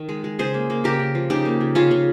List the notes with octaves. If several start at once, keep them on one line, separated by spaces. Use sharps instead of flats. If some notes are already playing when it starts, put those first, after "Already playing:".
Already playing: D#3
G#3
G#3
C#3 G#4 C5
A#3
A#3
C#3 G4 A#4
C#3
F3
C#3 D#4 G4
A#3
C#3
C#3 C#4 F4
C#3